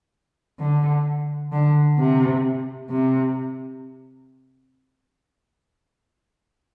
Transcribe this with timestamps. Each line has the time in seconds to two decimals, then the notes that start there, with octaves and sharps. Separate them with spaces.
0.60 D3
1.52 D3
1.99 C3
2.90 C3